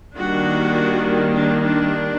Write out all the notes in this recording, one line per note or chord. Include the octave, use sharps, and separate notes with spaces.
D#3 G3 A#3 D4 F#4
D4
D4